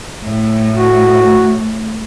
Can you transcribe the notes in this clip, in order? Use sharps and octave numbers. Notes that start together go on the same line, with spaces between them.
A2
F#4